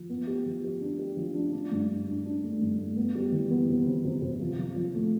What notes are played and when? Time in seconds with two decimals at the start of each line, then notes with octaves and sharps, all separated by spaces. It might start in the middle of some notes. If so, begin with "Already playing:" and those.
Already playing: F3
0.09 B3
0.27 G4
0.46 F3
0.64 G4
0.81 D4
0.99 G4
1.17 F3
1.35 D4
1.53 D4
1.71 G2
1.89 D4
2.08 D4
2.25 D4
2.44 A3
2.61 G2
2.79 A3
2.96 B3
3.15 G3
3.32 E3
3.51 B3
3.69 C3
3.86 C3
4.05 C3
4.22 C3
4.41 F3
4.59 F3
4.76 F3
4.94 A3